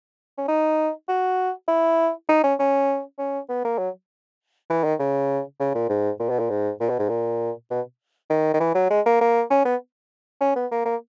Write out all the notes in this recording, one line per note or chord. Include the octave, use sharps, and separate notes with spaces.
C#4
D#4
F#4
E4
D#4
C#4
C#4
C#4
B3
A#3
F#3
E3
D#3
C#3
C#3
A#2
G#2
A#2
B2
A#2
G#2
A#2
B2
G#2
A#2
B2
D#3
D#3
E3
F#3
G#3
A#3
A#3
C#4
B3
C#4
B3
A#3
A#3